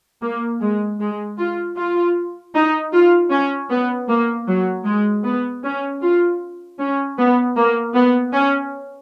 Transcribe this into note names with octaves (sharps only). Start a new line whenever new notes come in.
A#3
G#3
G#3
F4
F4
D#4
F4
C#4
B3
A#3
F#3
G#3
B3
C#4
F4
C#4
B3
A#3
B3
C#4